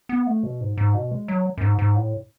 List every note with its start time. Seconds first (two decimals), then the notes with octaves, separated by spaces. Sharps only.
0.09 B3
0.27 A3
0.43 B2
0.61 G#2
0.77 G#2
0.95 B2
1.11 G#3
1.28 F#3
1.58 F#2
1.62 G#2
1.79 G#2
1.96 A2